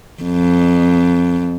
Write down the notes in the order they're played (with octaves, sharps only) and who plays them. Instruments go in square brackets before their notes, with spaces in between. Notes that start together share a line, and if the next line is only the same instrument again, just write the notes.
[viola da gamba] F2